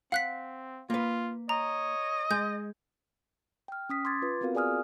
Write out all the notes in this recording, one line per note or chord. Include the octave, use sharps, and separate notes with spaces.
C4 F5 F#5 F#6 B6
A#3 F4 B4
C#5 D#5 A#5
G#3 G6
G5 F6
C#4 D#6 B6
C6 D6 G#6 A6
F4 B4
B3 C4 F4 F#4 A#4 F5
G#4 D5 G#5 D#6 F6